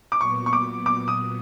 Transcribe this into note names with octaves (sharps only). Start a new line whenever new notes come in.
D6
A#2 F#3 B3 C#6
C#6
D6
D6
D#6